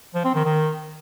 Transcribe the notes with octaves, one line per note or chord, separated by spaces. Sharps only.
F3
C4
D#3
D#3